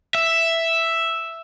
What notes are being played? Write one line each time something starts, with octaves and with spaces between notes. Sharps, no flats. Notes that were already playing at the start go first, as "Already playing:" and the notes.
E5